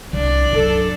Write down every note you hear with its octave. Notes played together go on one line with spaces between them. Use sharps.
C2 D4 D5
F#2 A4